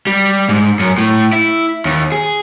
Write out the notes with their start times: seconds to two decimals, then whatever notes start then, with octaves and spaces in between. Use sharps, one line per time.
0.07 G3
0.49 G#2
0.80 F#2
0.98 A2
1.33 E4
1.85 D#2
2.12 G#4